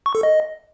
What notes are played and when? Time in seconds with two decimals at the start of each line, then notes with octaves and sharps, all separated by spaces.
0.06 C#6
0.15 A4
0.23 D#5